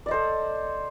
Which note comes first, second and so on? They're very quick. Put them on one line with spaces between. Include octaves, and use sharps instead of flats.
D5 D#5 C5 A4